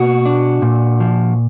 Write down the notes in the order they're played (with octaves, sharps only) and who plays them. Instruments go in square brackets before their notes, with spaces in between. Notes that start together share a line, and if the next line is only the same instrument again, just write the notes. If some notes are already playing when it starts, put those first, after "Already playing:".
Already playing: [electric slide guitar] B2 A#3 F#4
D4
A#2
F3